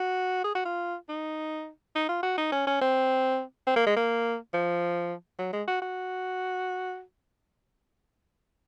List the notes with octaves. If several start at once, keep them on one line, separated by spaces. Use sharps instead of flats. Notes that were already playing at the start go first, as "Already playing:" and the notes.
Already playing: F#4
G#4
F#4
F4
D#4
D#4
F4
F#4
D#4
C#4
C#4
C4
C4
A#3
G#3
A#3
F3
F#3
G#3
F#4
F#4